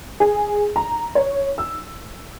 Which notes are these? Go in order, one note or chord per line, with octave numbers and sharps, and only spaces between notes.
G#4
A#5
C#5
E6